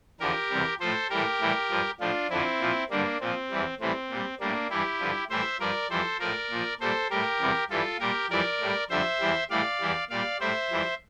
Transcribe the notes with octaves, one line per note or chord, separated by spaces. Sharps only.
E2 D3 F3 G4 A#4
E2 C3 G3
A2 F3 A4 C5
A2 E3 G3 G4 A#4
A2 E3 G3
G2 F3
A2 F3 D4 F4
F2 D3 F3 C4 E4
A#2 F3
G2 D3 G3 A#3 D4
A#2 F3 C4
E2 E3 G3
A2 E3 G3 C4
A#2 G3
A2 G3 A#3 D4
G2 E3 G3 E4 G4
G2 D3 F3
A2 E3 G3 C5 E5
G2 F3 A#4 D5
F2 E3 G3 A4 C5
A2 F3 A#4 D5
A#2 F3
A#2 G3 A4 C5
A2 G3 G4 A#4
E2 C3 G3
G2 E3 G3 F4 A4
A#2 G3 G4 A#4
F2 E3 G3 A#4 D5
A2 G3
F2 D3 G3 C5 E5
E2 E3 G3
A2 E3 G3 D5 F5
E2 E3 G3
A#2 G3 D5 F5
A2 G3 C5 E5
F2 E3 G3